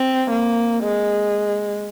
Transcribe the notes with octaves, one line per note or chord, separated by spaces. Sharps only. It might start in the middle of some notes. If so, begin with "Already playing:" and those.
Already playing: C4
A#3
G#3